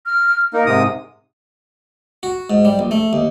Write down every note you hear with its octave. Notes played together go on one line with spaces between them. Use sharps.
F6
A#3 D#4 A#4
G#2 C3 D#6
F#4
G#2
G3
A#1
A3
D#2